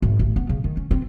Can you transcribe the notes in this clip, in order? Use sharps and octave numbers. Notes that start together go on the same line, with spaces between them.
G#1
A1
B3
C#3
D#3
C#4
C4